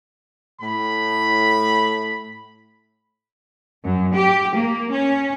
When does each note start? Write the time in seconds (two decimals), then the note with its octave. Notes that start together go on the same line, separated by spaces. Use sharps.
0.61 A2 B5
3.84 F#2
4.15 G4
4.56 A#3
4.91 C#4